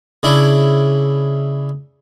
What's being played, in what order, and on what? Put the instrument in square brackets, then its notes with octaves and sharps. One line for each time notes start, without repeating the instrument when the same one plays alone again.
[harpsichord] C#3 D4 E4